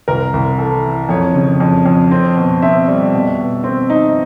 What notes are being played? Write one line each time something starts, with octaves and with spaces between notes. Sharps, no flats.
C2 A#4
C2
E3 A4
E3
F2 C#5
C#3
F2
F2
C4
B2
C4 E5
G3
B2
B2
C4
D#4